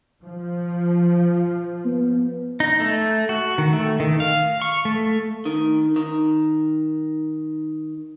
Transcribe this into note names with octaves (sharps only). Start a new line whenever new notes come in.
F3
B3
D#4
A3
F#4
D#3
A3
D#3
F5
C#6
A3
D#3
D#3